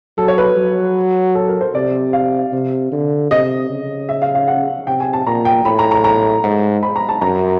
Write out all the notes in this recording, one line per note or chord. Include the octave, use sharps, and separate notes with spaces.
F#3 A4
C#5
B4
F#3
A4
A#4
C5
C3 D5
F5
C3
D3
C3 D#5
C#3
E5
F5
F5
F#5
C3 G5
G#5
A5
A#2 A#5
G5
A2 B5
A#5
A#5
A#5
G#2
B5
A#5
A5
F#2 A#5